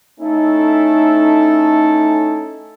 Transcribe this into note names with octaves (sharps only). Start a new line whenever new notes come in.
A3 C#4 D#4 E4 A4